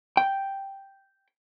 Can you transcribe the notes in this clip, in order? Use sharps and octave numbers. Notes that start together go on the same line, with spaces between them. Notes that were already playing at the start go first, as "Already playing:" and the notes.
G5